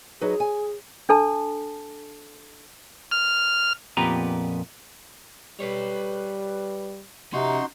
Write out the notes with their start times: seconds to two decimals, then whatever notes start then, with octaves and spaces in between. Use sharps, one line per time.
0.21 F#3 D#4 G#4 B4
0.40 G#5
1.09 D4 A4 A5
3.11 F6
3.97 F2 A#2 B3 G4 B4 A#5
5.60 G3 B4 C#5
7.33 C3 C#4 D#4 F#4 A#5 C6